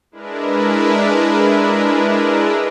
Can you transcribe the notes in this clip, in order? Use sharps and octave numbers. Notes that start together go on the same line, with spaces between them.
G#3 D4 E4 A#4 B4